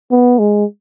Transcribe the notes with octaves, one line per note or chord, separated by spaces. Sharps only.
B3
G#3